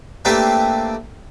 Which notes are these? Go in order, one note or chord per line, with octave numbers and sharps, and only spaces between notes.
A3 A#3 C4 D4 G4 B4